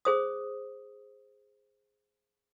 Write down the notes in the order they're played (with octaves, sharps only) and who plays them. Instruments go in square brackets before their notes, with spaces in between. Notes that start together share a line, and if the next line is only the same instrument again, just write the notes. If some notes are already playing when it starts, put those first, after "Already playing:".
[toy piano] G#4 C5 D#6